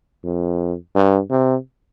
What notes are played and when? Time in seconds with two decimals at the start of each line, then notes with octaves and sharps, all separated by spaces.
0.24 F2
0.95 G2
1.31 C3